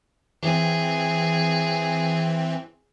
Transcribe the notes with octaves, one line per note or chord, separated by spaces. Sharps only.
E3 C4 G#4